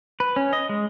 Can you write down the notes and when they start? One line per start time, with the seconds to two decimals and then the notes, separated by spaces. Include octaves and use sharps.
0.20 B4
0.36 C#4
0.53 D#5
0.69 G#3